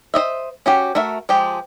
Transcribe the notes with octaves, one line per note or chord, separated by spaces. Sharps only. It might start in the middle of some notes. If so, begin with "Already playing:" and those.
C5 C#5 D#5 E5
C#4 F#4 G4
A3 F#4 A#4 E5
F3 G#3 G4